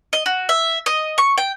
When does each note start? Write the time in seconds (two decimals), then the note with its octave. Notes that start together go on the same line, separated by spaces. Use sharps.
0.13 D#5
0.26 F#4
0.49 E5
0.86 D#5
1.18 C#6
1.38 G5